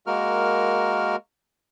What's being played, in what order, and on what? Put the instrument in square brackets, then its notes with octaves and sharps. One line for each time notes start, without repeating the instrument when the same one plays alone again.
[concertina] G#3 A#3 F#4 A#4 F6